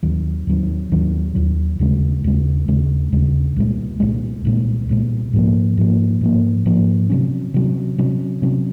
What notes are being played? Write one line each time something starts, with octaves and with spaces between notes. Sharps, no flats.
D#2 D#3 F#3
D#2 D#3 F#3
D#2 D#3 F#3
D#2 D#3 F#3
D#2 C#3 G#3
D#2 C#3 G#3
D#2 C#3 G#3
D#2 C#3 G#3
C2 A#2 G#3
C2 A#2 G#3
C2 A#2 G#3
C2 A#2 G#3
G#2 F3 A#3
G#2 F3 A#3
G#2 F3 A#3
G#2 F3 A#3
C3 F#3 C#4
C3 F#3 C#4
C3 F#3 C#4
C3 F#3 C#4